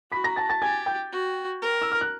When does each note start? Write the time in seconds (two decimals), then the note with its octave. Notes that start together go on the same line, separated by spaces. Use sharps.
0.11 F#4 B5 B6
0.24 A#5 A#6
0.36 A5 A6
0.49 A5 A6
0.62 G4 G#5 G#6
0.86 G5 G6
1.12 F#4
1.62 A#4
1.82 E6
1.92 F6
2.01 F#6